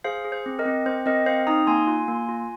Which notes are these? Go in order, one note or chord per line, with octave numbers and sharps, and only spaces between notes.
G#4 C5 F5
G#4
C5
C4
A#4 D#5
C4
C4 C5
C4 A#4 D#5
C4 C5 F5
D#4 A#5 D#6
A#3 G#5 C6
F4
A#3
F4